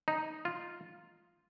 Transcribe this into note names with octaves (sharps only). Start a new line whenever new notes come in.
D#4
F4